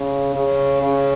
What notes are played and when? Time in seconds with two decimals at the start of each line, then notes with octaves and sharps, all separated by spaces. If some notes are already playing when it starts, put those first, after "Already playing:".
Already playing: C#3
0.35 C#3
0.83 C#3